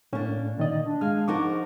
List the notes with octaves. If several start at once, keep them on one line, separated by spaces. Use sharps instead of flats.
A2 A#3 C#4 D4
A#2 D#3 D5 D#5
D4
G#3 F5 F6
F3 D#4 A#4 F#5 C#6 D6